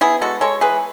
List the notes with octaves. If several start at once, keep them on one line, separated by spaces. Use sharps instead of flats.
B3 E4 G#4
G#3 F#4 A4
G#3 A4 C#5
E3 G#4 B4